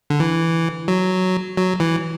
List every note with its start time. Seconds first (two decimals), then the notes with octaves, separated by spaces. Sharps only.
0.10 D3
0.20 E3
0.88 F#3
1.57 F#3
1.80 E3